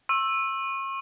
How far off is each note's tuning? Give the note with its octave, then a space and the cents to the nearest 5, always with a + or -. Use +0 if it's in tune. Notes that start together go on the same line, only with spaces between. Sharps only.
C#6 -40 E6 +0